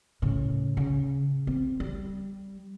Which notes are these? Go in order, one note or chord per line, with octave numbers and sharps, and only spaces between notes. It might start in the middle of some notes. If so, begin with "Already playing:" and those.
A2 C#3
C#3
C4
G3